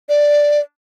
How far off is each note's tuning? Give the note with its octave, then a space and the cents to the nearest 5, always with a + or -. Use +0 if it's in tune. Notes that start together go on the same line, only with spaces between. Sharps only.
D5 +0